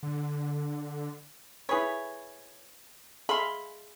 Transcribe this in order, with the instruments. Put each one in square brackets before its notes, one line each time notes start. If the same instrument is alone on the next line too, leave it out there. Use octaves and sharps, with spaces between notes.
[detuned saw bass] D3
[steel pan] E4 B4 B5 [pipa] G#4 C#5
[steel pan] G#4 E5 F5 [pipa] B5 C6